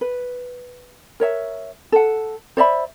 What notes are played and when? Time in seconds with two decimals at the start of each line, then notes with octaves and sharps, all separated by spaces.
0.01 B4
1.20 A#4 C#5 E5
1.92 A4 F#5
2.57 C5 D5 E5 B5